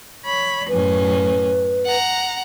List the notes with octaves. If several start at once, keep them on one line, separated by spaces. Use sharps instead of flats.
C#5 B5
F#2 A2 C#4 B4
F#5 A#5